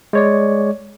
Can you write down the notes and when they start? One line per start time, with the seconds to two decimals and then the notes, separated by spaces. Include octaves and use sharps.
0.13 G#3 C#5 D5